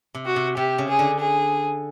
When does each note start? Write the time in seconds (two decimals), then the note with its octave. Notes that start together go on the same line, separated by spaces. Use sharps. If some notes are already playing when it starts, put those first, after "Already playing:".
0.15 C3
0.26 F#4
0.36 C3
0.57 C3 G4
0.78 C#3
0.89 G#4
0.99 D3
1.20 G#4